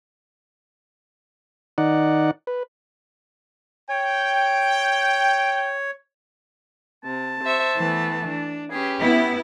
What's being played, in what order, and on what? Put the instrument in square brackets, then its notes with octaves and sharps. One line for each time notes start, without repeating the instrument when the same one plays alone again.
[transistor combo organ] D#3 D#4 D5 F#5
B4
[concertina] C#5 [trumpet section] G5
[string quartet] C3 [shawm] A5
[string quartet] C5 E5 C#6
E3 A3 B3
D4
[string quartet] C#4 G4 B4 [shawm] G#4
[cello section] B3 E4 [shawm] B5